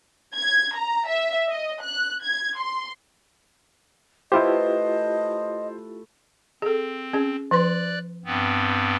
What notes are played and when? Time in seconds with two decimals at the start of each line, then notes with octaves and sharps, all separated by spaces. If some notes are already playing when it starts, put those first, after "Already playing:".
0.36 G#6
0.75 A#5
1.09 E5
1.49 D#5
1.83 F#6
2.24 G#6
2.58 C6
4.32 A3 E4 F4 G4 A4 B4 C5 D#5
6.62 C4 G#4 A4
7.13 C#4 G#4
7.51 F3 B4 D5 C6 F#6
8.25 G2 B3 C4